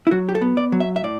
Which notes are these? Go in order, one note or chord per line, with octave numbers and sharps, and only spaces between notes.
E4
F#3 F#4
G4
A4
B3
D5
F#3
E5
E5
A2 D5